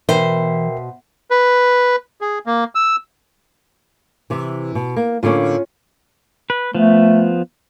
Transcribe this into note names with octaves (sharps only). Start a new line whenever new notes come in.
B2 E3 A#4 C5 E5 G5 C7
B4
G#4
A#3
E6
C3 E3
B2
A#3
A2 D3 A#3 C#4 F4
B4
F3 A3 B3